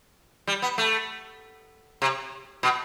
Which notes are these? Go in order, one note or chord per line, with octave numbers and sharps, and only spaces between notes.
G3
B3
A3
C3
B2